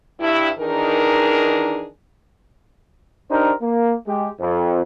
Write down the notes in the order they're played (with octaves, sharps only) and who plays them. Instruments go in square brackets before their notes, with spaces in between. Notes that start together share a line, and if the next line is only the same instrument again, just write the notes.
[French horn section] G2 E4
D#3 E3 D4 D#4 G#4 A#4
[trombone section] D4 D#4 G4 A#4 C5
A#3
G#3 G4
F2